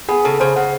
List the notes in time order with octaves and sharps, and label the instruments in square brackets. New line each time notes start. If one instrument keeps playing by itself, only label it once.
[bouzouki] B3 [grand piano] G#4
[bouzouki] C#3 [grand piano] A4
[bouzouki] C#3 [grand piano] C5
[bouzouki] C#3 [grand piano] F#5